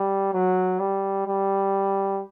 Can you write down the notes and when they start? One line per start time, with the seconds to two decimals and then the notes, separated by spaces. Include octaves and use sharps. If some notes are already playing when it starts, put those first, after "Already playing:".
Already playing: G3
0.33 F#3
0.79 G3
1.27 G3